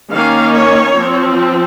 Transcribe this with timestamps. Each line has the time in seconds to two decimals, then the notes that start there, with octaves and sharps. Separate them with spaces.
0.12 D#3 A#3 C#4 F5
0.55 C#5
0.98 F3 C4